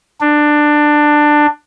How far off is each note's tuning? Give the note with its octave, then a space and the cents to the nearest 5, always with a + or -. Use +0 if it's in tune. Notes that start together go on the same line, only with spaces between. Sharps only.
D4 +15